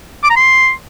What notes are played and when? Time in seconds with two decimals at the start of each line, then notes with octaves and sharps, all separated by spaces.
0.24 D6
0.30 A#5
0.36 C6